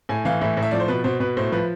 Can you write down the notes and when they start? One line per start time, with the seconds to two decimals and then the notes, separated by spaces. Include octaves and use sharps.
0.09 A2 G#5
0.25 E3 F5
0.41 A2 E5
0.57 A2
0.62 E5
0.71 F3 D5
0.80 C5
0.88 B2 B4
1.04 B2 C5
1.20 B2 B4
1.37 A2 C5
1.52 F3 B4